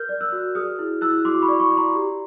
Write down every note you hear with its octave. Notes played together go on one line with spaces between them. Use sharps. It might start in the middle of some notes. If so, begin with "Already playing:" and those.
Already playing: A#4 F6 G6
D5
E6 F#6
F#4
G#4 D#6 F6
E4
E4 E6 F#6
F#4 C6 D6
B5 C#6
D5
B5 C#6
D5
A#5 C6
G4